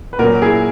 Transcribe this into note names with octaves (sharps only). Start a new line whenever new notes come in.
B4
A#2 F#3 F#4 A#4
E4 G#4